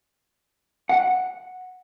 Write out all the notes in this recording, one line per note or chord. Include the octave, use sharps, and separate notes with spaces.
F#5